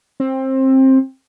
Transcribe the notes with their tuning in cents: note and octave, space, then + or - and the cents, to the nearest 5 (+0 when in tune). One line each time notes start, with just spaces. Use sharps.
C4 +20